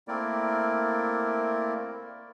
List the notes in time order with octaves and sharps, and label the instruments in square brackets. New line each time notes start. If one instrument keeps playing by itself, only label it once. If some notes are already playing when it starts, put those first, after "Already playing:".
[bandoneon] A3 A#3 C4 E4 A#4 D5